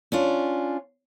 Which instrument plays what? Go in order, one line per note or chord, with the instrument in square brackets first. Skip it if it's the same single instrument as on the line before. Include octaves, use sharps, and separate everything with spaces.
[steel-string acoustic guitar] C#4 D4 F4